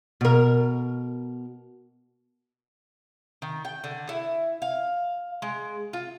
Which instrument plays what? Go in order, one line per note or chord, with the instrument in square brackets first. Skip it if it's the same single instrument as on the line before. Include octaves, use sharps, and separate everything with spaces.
[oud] B2 A#4
[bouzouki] D#3
G5
D3
E4
F5
G#3
F4